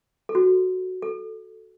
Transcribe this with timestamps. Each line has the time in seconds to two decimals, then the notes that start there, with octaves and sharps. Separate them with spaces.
0.29 A4
0.35 F#4
1.02 A4